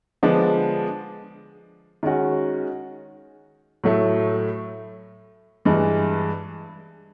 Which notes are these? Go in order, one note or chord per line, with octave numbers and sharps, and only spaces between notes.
D3 F3 G#3 B3 D4
D#3 G#3 C#4 F#4
A2 F#3 A3
G2 E3 G#3